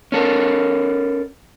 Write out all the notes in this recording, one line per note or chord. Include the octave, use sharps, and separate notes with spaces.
C#4 A4 A#4